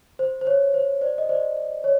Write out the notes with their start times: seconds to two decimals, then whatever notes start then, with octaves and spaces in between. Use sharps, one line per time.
0.19 C5
0.41 C5
0.47 C#5
0.74 C5
1.01 C5 D5
1.18 D#5
1.29 C5 D5
1.56 C5
1.84 C#5